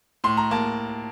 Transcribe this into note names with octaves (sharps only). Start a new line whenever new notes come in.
A2 C6
A#5
A#3 A5